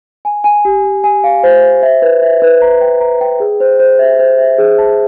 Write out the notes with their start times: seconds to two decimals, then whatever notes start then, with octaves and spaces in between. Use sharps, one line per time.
0.25 G#5
0.44 G#5
0.65 G4
0.84 G#5
1.04 G#5
1.24 F5
1.43 C5
1.63 C5
1.82 E5
2.02 B4
2.22 E5
2.42 B4
2.62 A#5
2.81 G5
3.01 A#5
3.21 G5
3.40 G#4
3.60 C5
3.80 C5
3.99 E5
4.19 C5
4.38 E5
4.58 G#4
4.78 A5